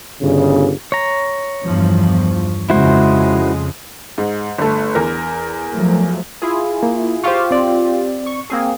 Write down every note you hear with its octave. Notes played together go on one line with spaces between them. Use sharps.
G1 C#3
C#5 A#5
E2 G2 F3
F2 C#3 G#3 E4 F#4 C5
G#2
G1 A3
E2 A#4
F3 F#3 A3
E4 F4 G#4
A#3
F4 G4 C5 F5 C#6
C4 D5
C#6
A#3 C4 G#4